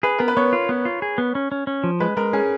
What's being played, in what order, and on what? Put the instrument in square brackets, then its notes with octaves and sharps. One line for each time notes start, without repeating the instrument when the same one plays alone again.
[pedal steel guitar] G#4 [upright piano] B4
[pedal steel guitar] B3 [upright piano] A#4
[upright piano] B4
[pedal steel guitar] B3 [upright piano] C#5
[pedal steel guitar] F4
B3
F4
G#4
B3
C#4
C#4
C#4
F3
[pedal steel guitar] G#3 [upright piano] B4
[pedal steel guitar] G#3 [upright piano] A#4
[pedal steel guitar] C#4 [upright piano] G#4